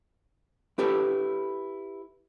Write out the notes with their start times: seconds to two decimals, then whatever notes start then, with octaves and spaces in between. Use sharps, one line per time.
0.78 E4 G4 A4 B4